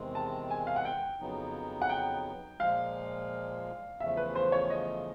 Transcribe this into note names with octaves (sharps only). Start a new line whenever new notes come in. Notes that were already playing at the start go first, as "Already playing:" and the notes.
Already playing: E2 C3 D#3 G#3 C4
A5
G#5
F5
F#5
G5
F2 C#3 F#3 B3 D#4
F#5
G5
A#2 F3 G#3 F5
E2 C#3 F3 A3 E5
B4
C5
C#5
D#5